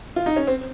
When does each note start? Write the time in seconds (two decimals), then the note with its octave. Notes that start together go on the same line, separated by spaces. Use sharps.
0.16 F4
0.26 D#4
0.36 C#4
0.47 C4